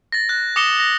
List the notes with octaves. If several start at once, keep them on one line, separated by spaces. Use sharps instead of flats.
A6 A#6
F#6 A#6
D6 D#6 A#6 C#7 E7 G7
A#6